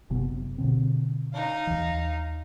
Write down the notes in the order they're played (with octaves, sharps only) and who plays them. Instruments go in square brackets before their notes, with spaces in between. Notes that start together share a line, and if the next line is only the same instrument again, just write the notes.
[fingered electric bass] F#1 C3 B3
B2 D3 C4
[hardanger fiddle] D#4 F5
[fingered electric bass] D#2 E3